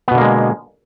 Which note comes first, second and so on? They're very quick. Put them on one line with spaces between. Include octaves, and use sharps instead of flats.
B3 B2 D3 A#3 G#3